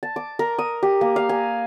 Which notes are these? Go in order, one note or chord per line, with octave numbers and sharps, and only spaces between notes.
A5
D6
A#4
D#6
G4
A#3
F5
G#5